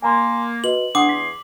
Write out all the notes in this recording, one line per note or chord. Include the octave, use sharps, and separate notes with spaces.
A#3 G#5 A#5 C6
F#4 B4 D#5 F#7
E2 D4 G#4 F#5 C6 D6 D#6
B6